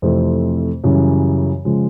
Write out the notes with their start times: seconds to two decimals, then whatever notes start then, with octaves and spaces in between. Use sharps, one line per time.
0.02 F2 C3 E3 A3 C4
0.84 F#2 C#3 E3 G3
1.65 C#3 F3 G#3